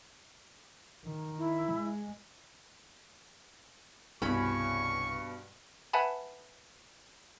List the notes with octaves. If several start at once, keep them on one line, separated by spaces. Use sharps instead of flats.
D#3
E4
G#3
C2 G2 B2 C#4 G#4 B5 C#6
B4 E5 F#5 G#5 A5 B5